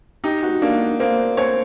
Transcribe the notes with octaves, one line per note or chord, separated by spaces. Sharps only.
D#4 G4
F#4
A#3 D4
A#3 C4
C4 C#5